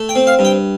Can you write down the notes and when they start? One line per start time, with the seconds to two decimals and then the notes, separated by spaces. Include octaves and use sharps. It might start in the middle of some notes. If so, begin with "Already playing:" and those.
Already playing: A3
0.09 G5
0.15 C4
0.27 F5
0.39 G2
0.45 G5